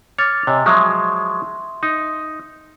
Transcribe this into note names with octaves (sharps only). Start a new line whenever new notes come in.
C#5 D6 F6 A6
C3 C#5 D#5 G#5
F3 F#3 G#3 E5 C6
D#4